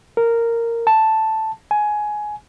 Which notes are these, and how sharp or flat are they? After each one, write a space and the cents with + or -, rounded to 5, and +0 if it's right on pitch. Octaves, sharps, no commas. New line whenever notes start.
A#4 -10
A5 +0
G#5 +15